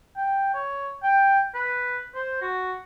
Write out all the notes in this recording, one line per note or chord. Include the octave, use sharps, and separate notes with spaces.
G5
C#5
G5
B4
C5
F#4